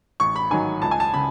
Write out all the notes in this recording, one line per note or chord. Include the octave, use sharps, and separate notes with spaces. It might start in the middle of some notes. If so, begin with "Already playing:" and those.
A1 C#6
B5
G#2 D#3 F#3 G#5
C#2 A5
G#5
A5
C#3 B5